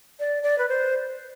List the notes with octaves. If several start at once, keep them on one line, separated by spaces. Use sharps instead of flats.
D5
D5
B4
C5